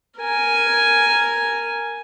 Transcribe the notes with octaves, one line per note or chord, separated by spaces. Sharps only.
A#4 G#5